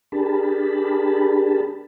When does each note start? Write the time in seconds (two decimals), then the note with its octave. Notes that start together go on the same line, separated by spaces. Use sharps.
0.12 D4 G4 G#4 A#4 A5 B5